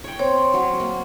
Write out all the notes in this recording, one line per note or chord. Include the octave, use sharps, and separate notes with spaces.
C#5 G5
C4 C#5
F#3 F5
A#3